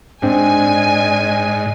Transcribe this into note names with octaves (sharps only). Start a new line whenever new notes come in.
G#2 C4 D4 D5 D#5 G#5